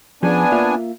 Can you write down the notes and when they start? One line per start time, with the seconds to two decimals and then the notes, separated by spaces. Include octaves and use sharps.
0.23 F3 B3 C#4 D4 G#4 G#5
0.52 A#3 F4 E5